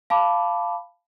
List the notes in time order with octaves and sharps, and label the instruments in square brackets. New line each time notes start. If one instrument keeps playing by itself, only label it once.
[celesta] F5 A5 B5 D6